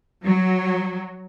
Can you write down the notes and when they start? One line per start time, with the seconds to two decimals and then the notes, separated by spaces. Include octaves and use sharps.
0.23 F#3